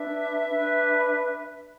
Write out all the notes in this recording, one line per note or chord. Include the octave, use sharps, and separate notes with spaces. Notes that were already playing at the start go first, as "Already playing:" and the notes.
Already playing: D4 B4 E5
D4 B4